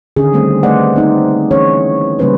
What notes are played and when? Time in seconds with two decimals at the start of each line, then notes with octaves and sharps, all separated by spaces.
0.16 D3 D#3 C#4 G#4
0.33 D#3 G3 A3 C4 D4 G4
0.63 A3 B4 C5 D5 D#5 F#5
0.94 A#3 C4 D#4
1.51 E3 C#4 D#4 G#4 C#5
2.19 C#3 G3 A#3 C#4 B4 C5